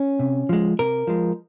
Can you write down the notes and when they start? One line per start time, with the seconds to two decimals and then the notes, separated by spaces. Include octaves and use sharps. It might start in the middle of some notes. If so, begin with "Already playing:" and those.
Already playing: C#4
0.19 C3
0.49 F3 G#3
0.79 C3 A#4
1.07 F3 G#3